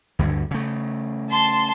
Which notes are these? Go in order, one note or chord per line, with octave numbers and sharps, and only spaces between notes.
D2 G2 D3
C#3 A3
A5 C6